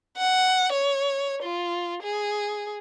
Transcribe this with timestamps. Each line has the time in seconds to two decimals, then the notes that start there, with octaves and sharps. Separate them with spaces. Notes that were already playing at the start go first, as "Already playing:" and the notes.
0.17 F#5
0.73 C#5
1.43 F4
2.02 G#4